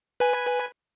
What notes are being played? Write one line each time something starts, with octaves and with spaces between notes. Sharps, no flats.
B4 G#5